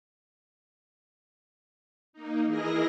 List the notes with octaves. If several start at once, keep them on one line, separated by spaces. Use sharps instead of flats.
A#3 D#4
E3 E4 G#4 A#4 D#5 A#6